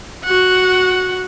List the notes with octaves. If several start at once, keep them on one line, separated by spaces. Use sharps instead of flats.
F#4 F#5